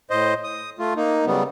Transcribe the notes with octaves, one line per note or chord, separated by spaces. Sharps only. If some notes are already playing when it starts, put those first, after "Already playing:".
A2 C5 D#5
D#6
A3 F4
A#3 D#4
C#3 F#3 G3 B3